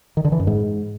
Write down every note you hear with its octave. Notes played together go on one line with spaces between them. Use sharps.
D#3
D3
E3
F#2
G#2